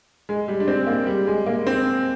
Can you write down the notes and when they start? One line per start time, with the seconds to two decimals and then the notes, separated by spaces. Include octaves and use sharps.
0.29 G#3
0.48 G3
0.60 D4
0.68 C4
0.81 G#3
0.87 A#3
1.06 G3
1.27 G#3
1.46 A#3
1.67 C4